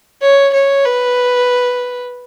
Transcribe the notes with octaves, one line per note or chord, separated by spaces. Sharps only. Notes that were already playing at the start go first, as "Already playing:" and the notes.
C#5
C#5
B4